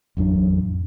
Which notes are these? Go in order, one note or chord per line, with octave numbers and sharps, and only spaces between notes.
A1 F2 F#3 D4